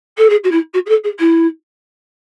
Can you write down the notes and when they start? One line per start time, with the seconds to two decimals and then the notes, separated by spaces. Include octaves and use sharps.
0.17 A4
0.29 G#4
0.44 F#4
0.51 E4
0.73 F#4
0.86 G#4
0.89 A4
1.04 G#4
1.19 E4